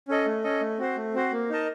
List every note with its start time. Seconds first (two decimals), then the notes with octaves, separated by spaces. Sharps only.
0.08 C#4 A4 D#5
0.26 A3
0.44 C#4 A4 D#5
0.61 A3
0.78 C4 F#4 C5
0.97 A3
1.14 C4 F#4 C5
1.32 A#3
1.49 D#4 A#4 D#5 A5